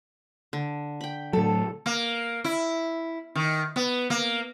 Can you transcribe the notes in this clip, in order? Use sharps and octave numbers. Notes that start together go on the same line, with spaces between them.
D3
G5 B5
A2 F#3 A4
A#3
E4
D#3
B3
A#3